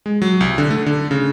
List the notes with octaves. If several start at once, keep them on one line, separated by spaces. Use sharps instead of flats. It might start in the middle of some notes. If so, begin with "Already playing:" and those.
G#3
F#3
C2
D3
A3
D3
C#3